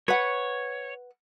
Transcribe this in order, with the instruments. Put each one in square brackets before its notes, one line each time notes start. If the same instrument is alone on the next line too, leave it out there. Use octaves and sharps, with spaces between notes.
[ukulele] B4 F#5 [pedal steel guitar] C#5